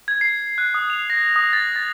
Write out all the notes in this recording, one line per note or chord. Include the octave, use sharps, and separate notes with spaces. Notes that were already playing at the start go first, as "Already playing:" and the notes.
G#6
C7
F#6
D#6
F7
A#6
D#6
A6
A6